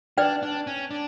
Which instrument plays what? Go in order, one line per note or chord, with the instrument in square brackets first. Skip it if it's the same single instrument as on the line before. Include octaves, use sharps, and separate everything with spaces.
[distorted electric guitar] D4 [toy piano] B4 D5 G5
[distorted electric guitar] D4
C#4
D4